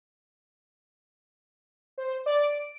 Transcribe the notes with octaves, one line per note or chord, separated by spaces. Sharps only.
C5
D5
D7